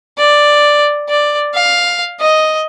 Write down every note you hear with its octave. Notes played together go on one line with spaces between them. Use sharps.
D5
D5
F5
D#5